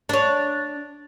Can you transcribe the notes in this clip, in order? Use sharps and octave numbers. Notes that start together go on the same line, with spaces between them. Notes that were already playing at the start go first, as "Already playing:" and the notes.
D4 C#5